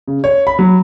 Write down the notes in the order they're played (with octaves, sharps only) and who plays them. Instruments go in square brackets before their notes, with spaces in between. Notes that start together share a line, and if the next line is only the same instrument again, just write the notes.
[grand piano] C#3
C#5
B5
F#3